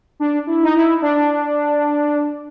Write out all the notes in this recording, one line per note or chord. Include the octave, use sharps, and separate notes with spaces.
D4
E4
D#4
E4
D4